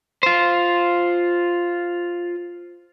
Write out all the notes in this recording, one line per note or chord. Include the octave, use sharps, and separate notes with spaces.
F4 C5